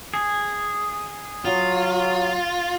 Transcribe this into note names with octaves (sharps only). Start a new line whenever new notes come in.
G#4
F#3 F4